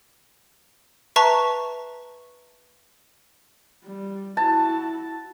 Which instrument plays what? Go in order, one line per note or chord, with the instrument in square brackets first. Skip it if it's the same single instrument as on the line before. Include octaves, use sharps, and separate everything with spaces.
[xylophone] B4 E5 A5 A#5 C#6
[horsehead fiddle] G3
[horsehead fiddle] E4 F#4 [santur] A5